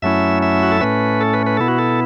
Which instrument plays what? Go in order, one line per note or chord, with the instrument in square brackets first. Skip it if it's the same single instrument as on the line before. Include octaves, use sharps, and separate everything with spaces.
[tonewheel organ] F#2 F#3 A3 C#4 E4 E5
E5
F#4
A4
A2 A3 C#4 B4
A4
B4
B4
B2 B3 E4 A4
F#4
A4